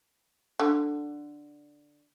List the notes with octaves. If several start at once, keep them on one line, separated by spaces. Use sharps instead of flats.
D3